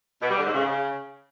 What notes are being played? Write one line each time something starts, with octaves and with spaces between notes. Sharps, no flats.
B2
G3
D3
G#2
C#3